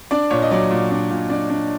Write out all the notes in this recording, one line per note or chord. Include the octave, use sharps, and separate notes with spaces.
D4 D5
A#2 C#5
D#5
F#3 D5
A#2
D4
A#2
D4 D5
D4